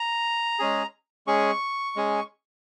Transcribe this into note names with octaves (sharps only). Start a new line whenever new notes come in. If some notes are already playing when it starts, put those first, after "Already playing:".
Already playing: A#5
G#3 C#4 G#4
G#3 C#4 G#4 C#6
G#3 C#4 G#4